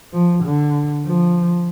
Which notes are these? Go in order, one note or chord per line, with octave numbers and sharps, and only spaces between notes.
F3
D3
F3